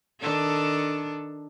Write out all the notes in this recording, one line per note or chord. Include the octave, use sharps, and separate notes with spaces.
D#3 D4 A4